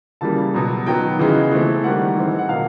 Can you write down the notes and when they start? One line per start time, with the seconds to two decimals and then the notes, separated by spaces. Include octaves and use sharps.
0.21 C#3 E3 G3 A#3 A5
0.54 B2 F#3 B3
0.86 D#3 F#3 B3 G5
1.19 C#3 E3 G#3 B3
1.52 E3 A3 C4
1.84 D#3 G3 A#3 F#5
2.17 E3 G#3 C4
2.39 F#5
2.49 B2 F#3 A#3 F5